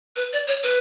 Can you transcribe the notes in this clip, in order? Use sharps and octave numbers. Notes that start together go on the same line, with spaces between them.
B4
D5
C#5
B4